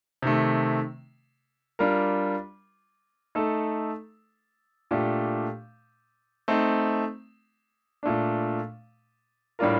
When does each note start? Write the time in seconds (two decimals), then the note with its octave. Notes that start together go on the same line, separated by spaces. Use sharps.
0.22 C3 D#3 A3
1.79 G3 D4 F4 A#4
3.35 A3 D#4 A4
4.91 A#2 A3 D4 G4
6.48 A3 C4 D#4
8.03 A#2 A3 D4
9.59 A2 G3 D4 F4 A#4